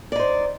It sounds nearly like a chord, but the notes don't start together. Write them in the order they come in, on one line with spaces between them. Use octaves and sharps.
D5 D#4 C5